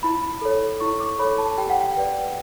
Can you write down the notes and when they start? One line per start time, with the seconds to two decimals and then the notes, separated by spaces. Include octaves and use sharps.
0.03 E4 B5
0.41 A4 C#5
0.80 E4 C#6
1.00 D6
1.19 A4 C#5 B5
1.38 A5
1.58 G4 G5
1.70 F#5
1.81 G5
1.97 B4 D5